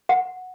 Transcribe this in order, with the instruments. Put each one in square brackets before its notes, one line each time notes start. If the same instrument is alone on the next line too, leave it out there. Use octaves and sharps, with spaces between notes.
[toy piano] F#5